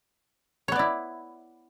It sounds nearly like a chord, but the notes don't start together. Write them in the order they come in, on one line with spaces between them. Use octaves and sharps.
C#5 B3 D5 E4